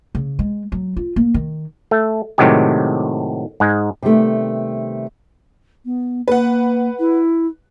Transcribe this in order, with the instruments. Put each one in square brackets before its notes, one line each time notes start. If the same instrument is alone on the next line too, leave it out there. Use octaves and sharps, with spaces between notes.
[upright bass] C#3
G#3
F#3
F4
A#3
D#3
[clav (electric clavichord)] A3
A2 C3 D#3 F#3 G#3 G4
G#2 G#3
[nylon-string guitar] C3 D#3 G3 A3 B3
[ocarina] B3
[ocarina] A#3 [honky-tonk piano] B4 F#5
[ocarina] E4